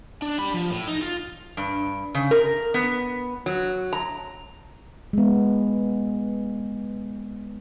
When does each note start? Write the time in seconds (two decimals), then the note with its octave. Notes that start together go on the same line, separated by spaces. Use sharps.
0.22 D4
0.38 G3 B5
0.54 F3
0.71 A2
0.88 D#4
1.02 F4
1.57 G2
2.15 C#3
2.31 A#4
2.74 B3
3.46 F#3
3.93 A#5
5.13 G#3 B3